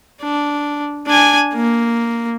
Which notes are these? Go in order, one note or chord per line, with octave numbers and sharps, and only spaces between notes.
D4
D4 G#5
A#3